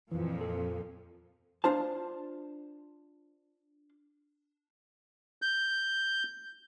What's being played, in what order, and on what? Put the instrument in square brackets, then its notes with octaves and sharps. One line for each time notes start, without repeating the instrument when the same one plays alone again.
[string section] F2 A#2 F3 [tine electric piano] E3
[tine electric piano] A4
[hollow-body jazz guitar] D4 F4 C5 A5
[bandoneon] G6